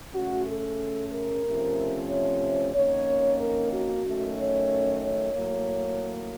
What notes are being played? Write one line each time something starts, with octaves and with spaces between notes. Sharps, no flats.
C#3 A3 C#4 F#4
A4
A#4
C3 F3 A3 C#4
C#5
F2 D#3 A#3 C#4 C#5
A#4
F#4
F#2 D#3 A3 C#4
C#5
C#5
A2 F#3 A#3